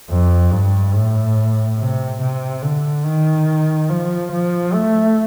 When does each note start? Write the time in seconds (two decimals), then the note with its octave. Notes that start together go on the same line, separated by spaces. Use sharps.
0.10 F2
0.51 G2
0.94 A2
1.78 C3
2.21 C3
2.62 D3
3.05 D#3
3.90 F3
4.31 F3
4.74 A3